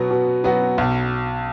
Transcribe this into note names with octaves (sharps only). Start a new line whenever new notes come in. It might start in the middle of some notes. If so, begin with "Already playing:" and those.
Already playing: B2 F#3 B3 F#4
B2
F#3 B3 F#4
B1